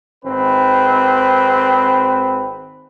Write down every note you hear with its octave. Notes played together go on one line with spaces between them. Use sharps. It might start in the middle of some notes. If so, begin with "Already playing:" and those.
G#1 C4 B4